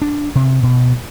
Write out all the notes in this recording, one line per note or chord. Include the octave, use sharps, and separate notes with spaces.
D4
C3
B2